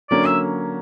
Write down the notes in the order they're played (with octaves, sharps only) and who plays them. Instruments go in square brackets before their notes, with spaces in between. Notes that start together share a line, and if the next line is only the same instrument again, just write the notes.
[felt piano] D3 F#3 A#3 C#4 [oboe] D5
[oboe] E5